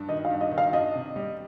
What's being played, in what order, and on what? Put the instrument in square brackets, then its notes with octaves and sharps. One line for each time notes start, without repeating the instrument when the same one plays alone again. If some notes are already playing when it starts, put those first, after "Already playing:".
Already playing: [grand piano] G2 D4
[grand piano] D#3 [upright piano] D#5
[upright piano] F5
[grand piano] G2
[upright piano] D#5
[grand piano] D#3
[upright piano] F5
[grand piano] D4 [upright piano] D#5
[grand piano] C3
G3